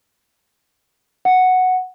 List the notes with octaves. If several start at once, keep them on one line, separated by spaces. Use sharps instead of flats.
F#5